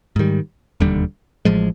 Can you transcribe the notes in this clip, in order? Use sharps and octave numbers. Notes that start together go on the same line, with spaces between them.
G#2 D#3 G3
E1 D#2 D3 G3
A1 A2 F3 G#3